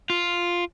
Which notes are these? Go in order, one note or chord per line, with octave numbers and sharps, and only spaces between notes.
F4